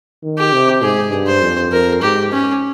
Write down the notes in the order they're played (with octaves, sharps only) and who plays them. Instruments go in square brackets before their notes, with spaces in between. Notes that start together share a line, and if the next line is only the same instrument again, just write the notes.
[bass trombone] D#3
[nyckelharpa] G4
[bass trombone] C3
[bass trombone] G#2 [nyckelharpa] G#4
[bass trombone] G2
[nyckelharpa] C5
[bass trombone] F2
[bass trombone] F2 [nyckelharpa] A#4
[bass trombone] G#2 [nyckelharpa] G4
[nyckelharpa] C#4